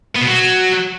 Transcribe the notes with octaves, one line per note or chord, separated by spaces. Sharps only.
B3
B2
F#3